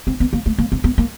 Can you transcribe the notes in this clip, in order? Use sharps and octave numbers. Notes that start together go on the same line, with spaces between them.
C4
B3
A#3
A3
A#3
C4
B3
A#3